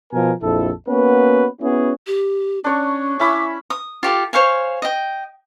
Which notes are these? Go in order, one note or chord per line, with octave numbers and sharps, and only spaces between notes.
B2 F3 B3 A#4 G#5
A#1 F2 E4 A4
A#3 B3 C#4 F#4 B4
B3 C#4 E4 F#4 G#4
G4
C#4 D4 C#5 C#6
C#4 E4 B5 D6
D#6
F4 G4 A4
C5 C#5 F5 G#5
D#5 G5